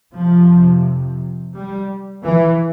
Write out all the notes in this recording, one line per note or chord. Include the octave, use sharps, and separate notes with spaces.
F2 C3 F3
G3
E3